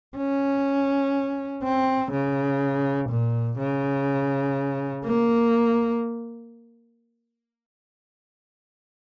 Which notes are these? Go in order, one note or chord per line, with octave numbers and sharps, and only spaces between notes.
C#4
C4
C#3
A#2
C#3
A#3